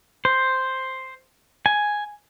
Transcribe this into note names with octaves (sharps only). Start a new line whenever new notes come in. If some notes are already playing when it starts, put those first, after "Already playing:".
C5
G#5